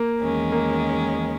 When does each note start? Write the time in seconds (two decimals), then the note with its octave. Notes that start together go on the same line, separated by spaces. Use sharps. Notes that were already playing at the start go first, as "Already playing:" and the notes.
Already playing: A#3
0.20 E2 D#3 G#3 C#4
0.52 A#3